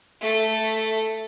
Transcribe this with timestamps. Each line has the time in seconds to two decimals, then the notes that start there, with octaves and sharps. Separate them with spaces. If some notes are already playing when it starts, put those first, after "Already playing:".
0.21 A3 A4